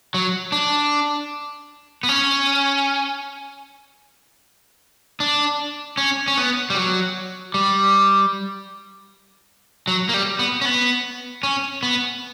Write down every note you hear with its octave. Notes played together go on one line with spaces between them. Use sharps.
F#3
D4
B3
C#4
D4
C#4
C#4
B3
G3
F#3
G3
F#3
A#3
G3
B3
C#4
B3
C#4
B3